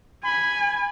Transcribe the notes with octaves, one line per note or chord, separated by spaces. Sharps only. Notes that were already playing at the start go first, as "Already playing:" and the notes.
G#5 B5